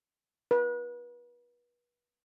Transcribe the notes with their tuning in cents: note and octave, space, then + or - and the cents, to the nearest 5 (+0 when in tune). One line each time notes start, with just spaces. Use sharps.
B4 -35